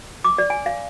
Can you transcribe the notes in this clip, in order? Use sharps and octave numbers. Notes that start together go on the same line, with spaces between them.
D6
D5
G#5
F5